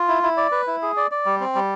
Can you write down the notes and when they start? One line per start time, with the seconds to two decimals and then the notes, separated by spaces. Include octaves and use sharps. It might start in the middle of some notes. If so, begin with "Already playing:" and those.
Already playing: F4
0.08 E4
0.23 E4
0.37 D5
0.52 B4
0.67 E4
0.82 G#4
0.97 D5
1.11 D5
1.26 G3
1.40 C4
1.55 G3